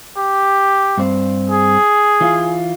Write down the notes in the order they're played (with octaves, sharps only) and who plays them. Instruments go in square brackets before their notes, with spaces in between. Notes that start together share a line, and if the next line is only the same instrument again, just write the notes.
[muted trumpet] G4
[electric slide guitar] G2 C4
[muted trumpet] G#4
[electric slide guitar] E3 F4